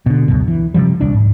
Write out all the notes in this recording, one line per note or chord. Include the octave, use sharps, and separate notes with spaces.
B2 D3
C#2 F#2 B2
E3
C3 D#3 F3 G3
D#1 C2 D4
G#2